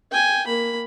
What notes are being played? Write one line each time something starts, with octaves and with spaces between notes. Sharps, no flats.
G5 G#5
A#3 B5